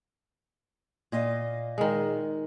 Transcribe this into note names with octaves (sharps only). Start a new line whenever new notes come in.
A#2 D#5 F5
D#3 G#3